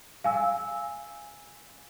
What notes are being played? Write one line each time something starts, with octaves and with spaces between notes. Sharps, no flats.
F5 G#5 E6